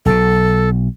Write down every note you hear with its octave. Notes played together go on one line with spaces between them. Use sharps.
B1 B2 A4